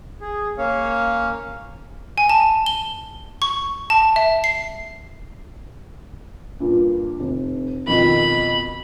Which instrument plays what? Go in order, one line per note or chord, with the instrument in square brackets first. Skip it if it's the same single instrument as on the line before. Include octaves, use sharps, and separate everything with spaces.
[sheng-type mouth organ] G#4
A#3 C#4 C#5 F5
[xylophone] G#5
A5
G7
C#6
A5
E5
C7
[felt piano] G2 A#2
F1
[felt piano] F2 B2 D#3 [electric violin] B5